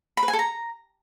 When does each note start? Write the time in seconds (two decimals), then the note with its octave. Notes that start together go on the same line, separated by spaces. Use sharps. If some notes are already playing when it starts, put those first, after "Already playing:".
0.17 B5
0.23 B4
0.28 G#5
0.33 A4
0.39 A#5